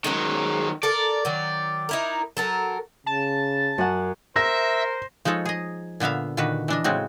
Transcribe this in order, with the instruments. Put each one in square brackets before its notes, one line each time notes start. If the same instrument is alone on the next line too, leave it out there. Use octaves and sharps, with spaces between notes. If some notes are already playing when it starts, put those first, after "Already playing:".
[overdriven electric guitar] D#3 F#3 [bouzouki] G#3 C#4
[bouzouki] A4 A#4 [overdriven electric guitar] D5
[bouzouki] D#3 F#3
D#4 E4 A#4
F#3 A4 A#4
[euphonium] C#3 [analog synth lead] A5
[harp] F#2 F#5
[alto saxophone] A#4 [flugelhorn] C5 [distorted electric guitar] E5 [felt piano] A#6
[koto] F3 G#3 D#4 A4 C#5
G#4 D#5
A#2 D3 B3 E5 F5
A#2 D3 D#3 F#4 B4
E3 D4 D#5
A2 C#3 G#3 C4 F#4